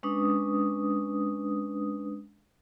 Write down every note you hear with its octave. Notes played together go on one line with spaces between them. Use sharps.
G#3 C#4 D4 B4 D#6